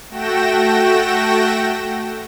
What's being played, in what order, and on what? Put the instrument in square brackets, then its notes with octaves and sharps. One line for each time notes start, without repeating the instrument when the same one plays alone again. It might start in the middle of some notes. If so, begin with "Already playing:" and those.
[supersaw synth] A3 F#4 G5 A#6 E7